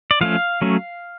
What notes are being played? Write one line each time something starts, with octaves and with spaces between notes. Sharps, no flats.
D5
F3 A3 C#4 F5
F#3 A3 C#4